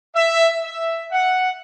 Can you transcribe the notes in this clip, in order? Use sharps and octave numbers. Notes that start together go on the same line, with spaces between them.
E5
E5
F#5